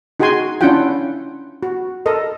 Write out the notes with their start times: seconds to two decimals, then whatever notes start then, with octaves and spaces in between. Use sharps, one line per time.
0.20 D#4 F#4 G#4 G5 G#5 C6
0.61 C#4 D4 E4 F4 F#5 G5
1.63 F#4
2.06 A4 A#4 D#5